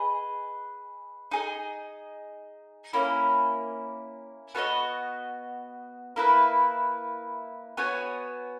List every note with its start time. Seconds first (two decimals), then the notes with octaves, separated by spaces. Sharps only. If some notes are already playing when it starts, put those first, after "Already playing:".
Already playing: G#4 B4 D#5
1.31 D#4 G#4 D#5
2.93 A#3 C#4 E4
4.55 B3 F#4 B4 D#5
6.16 A#3 E4 B4 E5
7.77 B3 F#4 C#5 G#5